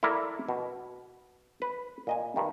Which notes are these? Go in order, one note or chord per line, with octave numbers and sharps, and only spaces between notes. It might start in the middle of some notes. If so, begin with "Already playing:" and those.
E4 A4 A#4 D5
B2
B4
A#2 D#5 G#5
G2 D#3